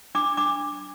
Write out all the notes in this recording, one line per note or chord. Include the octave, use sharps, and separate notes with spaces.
D4 D6
D4 D6